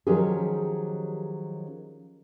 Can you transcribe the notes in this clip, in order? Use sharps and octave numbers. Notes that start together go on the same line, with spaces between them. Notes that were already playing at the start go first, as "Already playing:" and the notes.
D#3 F3 F#3 C#4 G4 G#4